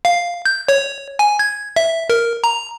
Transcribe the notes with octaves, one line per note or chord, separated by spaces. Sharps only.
F5
G6
C#5
G#5
G#6
E5
A#4
A#5